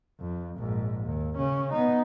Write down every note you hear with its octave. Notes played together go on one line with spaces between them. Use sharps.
F2
A#1 G#2
D#2
C#3 C#4
B3 D#4